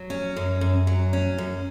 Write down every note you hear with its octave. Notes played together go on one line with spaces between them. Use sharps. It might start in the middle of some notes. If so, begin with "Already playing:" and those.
Already playing: F#3
C#4
F#2
F#2
F#3
C#4
F#2